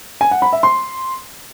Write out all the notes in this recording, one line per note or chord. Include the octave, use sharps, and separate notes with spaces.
G#5
F#5
B5
E5
C6